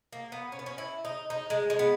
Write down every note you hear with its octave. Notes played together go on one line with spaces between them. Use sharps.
A#3
B3
C#4
B3
C#4
E4
D#4
D#4
G#3
G#3
B3